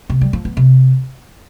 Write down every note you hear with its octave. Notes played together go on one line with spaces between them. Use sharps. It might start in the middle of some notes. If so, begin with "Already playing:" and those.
C3
G3
F3
B3
C3